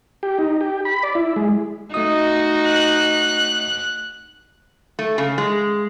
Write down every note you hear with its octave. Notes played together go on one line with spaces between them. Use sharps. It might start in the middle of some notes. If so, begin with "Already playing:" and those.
G4
D#4
G4
B5
D5
E4
G#3
A3 D#4 F#4 D#5 D#6
F#6
A3
C#3
G#3